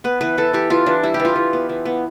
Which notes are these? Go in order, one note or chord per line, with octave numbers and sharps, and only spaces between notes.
B3 B4
E3 B4
E3 A4
E3 G4
E3 F4
E3 D4
G3 E4
G4
E3
F4
E3
B3
E3
B3